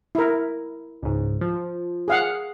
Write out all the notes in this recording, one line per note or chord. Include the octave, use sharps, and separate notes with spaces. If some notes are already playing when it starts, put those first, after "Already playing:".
E4 A#4
C#2 G#2
F3
G#4 F5 F#5